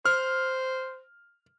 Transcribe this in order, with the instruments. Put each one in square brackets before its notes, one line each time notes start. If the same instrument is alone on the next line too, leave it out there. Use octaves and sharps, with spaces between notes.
[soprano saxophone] C5 [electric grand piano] F6